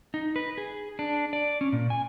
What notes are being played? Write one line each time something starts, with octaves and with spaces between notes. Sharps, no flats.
D#4
B4
G#4
D4
D5
C#4
A#2
G#5